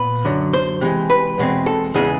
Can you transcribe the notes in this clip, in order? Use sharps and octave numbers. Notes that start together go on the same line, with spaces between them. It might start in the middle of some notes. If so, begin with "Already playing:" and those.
Already playing: A#2 B3 B4
F#2 D3 F#3
C5
C3 E3 G#3
B4
E2 B2 G#3 C4
A4
E2 C#3 E3 G#3 G#4